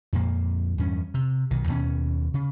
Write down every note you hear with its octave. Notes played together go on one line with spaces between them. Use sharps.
F2 A#2 A#3
E2 G2 C#4
C3
B1 D#3
D#2 B2 A#3 C#4
C#3